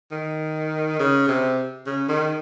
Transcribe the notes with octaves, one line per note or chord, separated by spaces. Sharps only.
D#3
C#3
C3
C#3
D#3